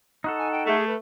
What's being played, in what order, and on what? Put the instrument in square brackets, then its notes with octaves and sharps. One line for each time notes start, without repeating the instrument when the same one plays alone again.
[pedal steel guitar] D#4 F#4 A4
[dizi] G#5
G5
[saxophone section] A3 [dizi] G#4
[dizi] B4